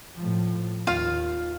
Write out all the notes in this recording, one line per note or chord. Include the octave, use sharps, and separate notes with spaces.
A2 F3
D#2 F4 F5